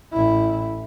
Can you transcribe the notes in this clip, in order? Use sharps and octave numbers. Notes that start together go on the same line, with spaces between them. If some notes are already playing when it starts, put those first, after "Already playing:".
A1 E4